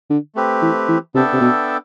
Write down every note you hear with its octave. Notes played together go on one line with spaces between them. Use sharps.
D3
A3 C4 G4 B4
E3
E3
C3 B3 D4 A4 E5 G5
C3
B2